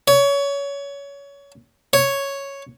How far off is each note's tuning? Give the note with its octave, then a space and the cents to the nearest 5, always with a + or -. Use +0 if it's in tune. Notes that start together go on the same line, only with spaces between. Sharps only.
C#5 +25
C#5 +0